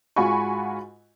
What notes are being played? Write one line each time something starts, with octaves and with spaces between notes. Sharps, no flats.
G#2 F4 F#4 G#5 B5 C#6